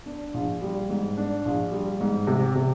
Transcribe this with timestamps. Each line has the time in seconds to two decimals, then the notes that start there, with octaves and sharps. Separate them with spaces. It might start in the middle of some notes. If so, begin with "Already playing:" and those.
0.06 D4
0.34 A#1
0.62 G3
0.89 G#2
1.17 D4
1.45 A#1
1.72 G3
2.00 G#2
2.27 C3
2.55 C3